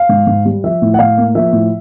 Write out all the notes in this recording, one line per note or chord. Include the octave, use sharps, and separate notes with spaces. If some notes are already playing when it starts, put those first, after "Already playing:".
Already playing: F5
G#2
G#2
G3
F3 E5
A2
F#5
A2 F5
A#3
F3 E5
A2